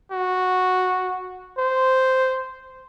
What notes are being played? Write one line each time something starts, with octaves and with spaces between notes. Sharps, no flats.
F#4
C5